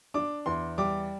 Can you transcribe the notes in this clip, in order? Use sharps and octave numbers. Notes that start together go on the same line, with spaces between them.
D4 D6
E2 C6
G3 D6